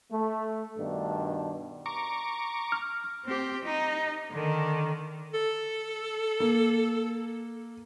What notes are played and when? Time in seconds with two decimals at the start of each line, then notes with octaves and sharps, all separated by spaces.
0.11 A3
0.77 G2 B2 D#3 D4
1.86 A#5 C#6 D6
2.72 F6
3.25 C4 G4
3.65 D#4
4.31 D3 D#3
5.34 A4
6.40 A#3